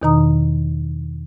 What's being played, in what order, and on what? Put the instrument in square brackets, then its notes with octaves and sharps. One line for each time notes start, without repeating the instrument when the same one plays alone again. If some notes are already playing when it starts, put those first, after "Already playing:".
[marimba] E2 B2 D#3 D#4 A#5 D#6